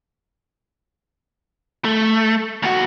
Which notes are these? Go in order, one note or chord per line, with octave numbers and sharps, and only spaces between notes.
A3
D#2 F#4